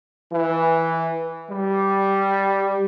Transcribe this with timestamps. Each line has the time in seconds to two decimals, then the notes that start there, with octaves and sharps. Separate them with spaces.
0.32 E3
1.50 G3